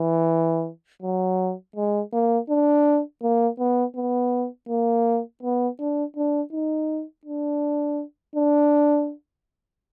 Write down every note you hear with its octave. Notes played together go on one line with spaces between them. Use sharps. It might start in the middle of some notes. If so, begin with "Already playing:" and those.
Already playing: E3
F#3
G#3
A#3
D4
A#3
B3
B3
A#3
B3
D4
D4
D#4
D4
D4